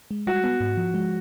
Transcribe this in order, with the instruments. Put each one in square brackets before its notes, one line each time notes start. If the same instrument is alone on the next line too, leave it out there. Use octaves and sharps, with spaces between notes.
[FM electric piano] G#3
[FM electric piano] G3 [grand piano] F#4
[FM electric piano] B3
G#2
F3
G#3